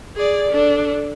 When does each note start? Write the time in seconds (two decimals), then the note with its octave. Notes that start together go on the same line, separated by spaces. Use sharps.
0.16 G#4 D5
0.50 D4 A4